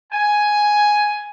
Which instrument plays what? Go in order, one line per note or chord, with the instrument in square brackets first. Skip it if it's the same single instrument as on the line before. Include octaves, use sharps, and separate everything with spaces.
[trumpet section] G#5